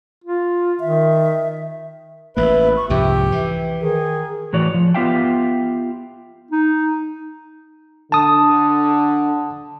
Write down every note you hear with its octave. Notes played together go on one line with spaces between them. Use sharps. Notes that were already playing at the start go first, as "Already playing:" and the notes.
F4
D#3 E5
A1 A#3 B4 E5
C#6
C2 F2 G#2 G4 E5
E3 E5
D#3 G#4
A2 E3 F#4 C#5 D5
F3
B3 F4 G4 E5 F5 G5
D#4
D3 A5 D#6